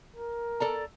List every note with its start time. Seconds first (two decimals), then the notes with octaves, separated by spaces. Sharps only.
0.16 A#4
0.60 A4 D5 A#5